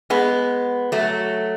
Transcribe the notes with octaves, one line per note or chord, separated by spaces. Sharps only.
G#3 B3
F#3 A3